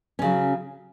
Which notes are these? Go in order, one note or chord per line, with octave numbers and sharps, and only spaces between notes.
C#3 F#3 C#4